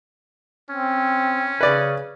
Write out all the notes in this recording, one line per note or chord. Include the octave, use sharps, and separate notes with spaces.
C4 C#4
C#3 B4 D5